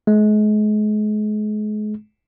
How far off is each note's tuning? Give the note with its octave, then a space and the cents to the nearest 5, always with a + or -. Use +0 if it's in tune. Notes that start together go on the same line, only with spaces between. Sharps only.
G#3 +35